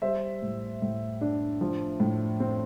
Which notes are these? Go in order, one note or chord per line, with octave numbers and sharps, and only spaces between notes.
G3 C5 E5
A2
A2
D4
F3
A2
C4